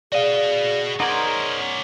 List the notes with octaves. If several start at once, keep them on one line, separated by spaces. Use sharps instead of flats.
F#4 G#4 D5 D#5 F5
C#4 D#4 A#4 C5 D5 F#5 C6 G#6